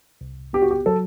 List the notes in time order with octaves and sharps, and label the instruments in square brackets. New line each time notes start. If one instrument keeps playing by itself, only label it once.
[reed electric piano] C2
[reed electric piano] B3 [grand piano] G4
[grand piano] F#4
G4
[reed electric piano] F#3 [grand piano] A4